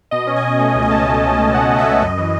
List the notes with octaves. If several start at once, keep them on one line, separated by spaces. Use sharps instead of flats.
B2 D#5
C#4
G#5
C#4
A3
C#2
G#5
A3 A5
G#5
C#4
C#4
C#4
A3 F#5
A3
E5
C#2
F#2 D#5
E3